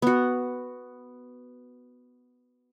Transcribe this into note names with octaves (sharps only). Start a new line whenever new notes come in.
B3 F#4